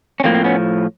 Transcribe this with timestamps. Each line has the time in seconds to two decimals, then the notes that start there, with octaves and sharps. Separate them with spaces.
0.20 C#4
0.24 A2 F3 A#3 C4
0.34 C4
0.44 B3 C#4